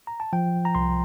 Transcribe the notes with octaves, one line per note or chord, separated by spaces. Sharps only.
A#5
A5
F3 G5
A#5
C2 C6